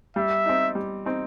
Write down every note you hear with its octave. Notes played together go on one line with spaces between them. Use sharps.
G3 E5
C4 D#4
G3
C4 D#4